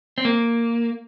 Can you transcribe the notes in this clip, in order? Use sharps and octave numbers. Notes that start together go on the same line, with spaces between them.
C4
A#3